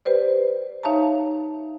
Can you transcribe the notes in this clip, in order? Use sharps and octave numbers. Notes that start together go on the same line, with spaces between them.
G4 B4 C5 D5
D#4 C#5 E5 F5 A5 A#5